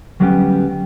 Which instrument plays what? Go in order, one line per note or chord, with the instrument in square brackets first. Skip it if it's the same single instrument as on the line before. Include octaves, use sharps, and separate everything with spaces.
[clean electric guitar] D2 F#3 G3 B3 C#4 G5